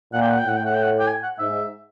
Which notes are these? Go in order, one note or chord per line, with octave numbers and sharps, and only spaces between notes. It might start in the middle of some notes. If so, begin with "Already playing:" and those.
A#2 F#5
G5
F#5
G5
A2 F#5
G5
F#5
G5
F#5
G5
G#5
F#5
G#2 E5